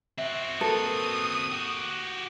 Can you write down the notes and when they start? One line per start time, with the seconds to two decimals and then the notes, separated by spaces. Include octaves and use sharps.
0.18 C4 F#4 E5
0.61 A#3 A4 B4 D#6
1.52 F#4 G4